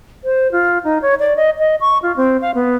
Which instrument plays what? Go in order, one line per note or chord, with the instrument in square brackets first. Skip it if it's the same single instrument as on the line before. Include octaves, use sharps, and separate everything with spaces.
[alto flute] C5
F4
D#4
C#5
D5
D#5
D#5
C#6
F4
C4
F5
B3